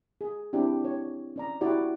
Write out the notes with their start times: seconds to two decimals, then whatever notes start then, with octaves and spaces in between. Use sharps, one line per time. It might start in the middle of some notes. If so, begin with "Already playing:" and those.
0.21 G#4
0.53 C4 D4 E4 G4
0.85 C#5
1.36 C#4 D5 A#5
1.61 E4 F#4 G4 D5